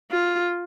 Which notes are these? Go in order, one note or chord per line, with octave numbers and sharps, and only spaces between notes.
F4